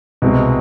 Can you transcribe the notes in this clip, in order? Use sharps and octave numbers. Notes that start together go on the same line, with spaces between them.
C2 B2 G#3 C4